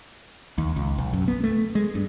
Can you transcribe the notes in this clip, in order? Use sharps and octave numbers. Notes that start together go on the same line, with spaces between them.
D#2
C#2
B1
F#2
B3
A3
G#3
G2